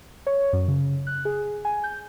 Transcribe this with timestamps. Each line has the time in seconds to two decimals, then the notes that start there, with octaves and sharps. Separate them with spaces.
0.27 C#5
0.53 F#2
0.68 C#3
1.07 F#6
1.25 G#4
1.65 G#5
1.84 G6